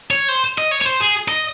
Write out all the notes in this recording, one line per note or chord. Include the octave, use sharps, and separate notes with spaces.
C#5
C5
D#5
C#5
C#5
C5
G#4
D#5